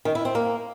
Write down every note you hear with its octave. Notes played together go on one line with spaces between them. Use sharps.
D#3
E4
C4
A#3